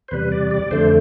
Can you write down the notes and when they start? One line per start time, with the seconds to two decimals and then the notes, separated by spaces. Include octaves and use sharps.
0.08 C5
0.11 E2 C3 G3 B4
0.32 D5
0.51 D5
0.71 F2 D3 A3 C5